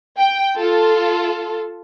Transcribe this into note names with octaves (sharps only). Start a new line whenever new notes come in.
G5
F4 A4